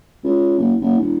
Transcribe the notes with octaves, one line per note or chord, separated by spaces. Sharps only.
C#2
F#1
F#1
E1